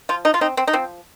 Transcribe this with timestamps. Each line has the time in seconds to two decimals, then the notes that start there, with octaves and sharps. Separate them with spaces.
0.09 F3 F4
0.25 D#4
0.34 F4
0.41 C4 D#4
0.57 C4
0.67 D#4
0.73 F3 C4